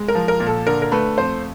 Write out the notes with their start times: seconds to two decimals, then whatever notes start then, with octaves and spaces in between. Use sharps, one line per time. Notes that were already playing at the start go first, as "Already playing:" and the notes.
Already playing: G#3
0.08 A#4
0.15 F3
0.28 A#4
0.40 A#2
0.47 A4
0.67 D3 A#4
0.82 A#4
0.92 A3 B4
1.18 F2 C5